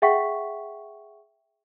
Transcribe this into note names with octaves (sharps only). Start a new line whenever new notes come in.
G#4 E5 F#5 G5 C#6 B6